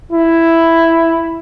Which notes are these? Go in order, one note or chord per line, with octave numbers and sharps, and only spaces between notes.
E4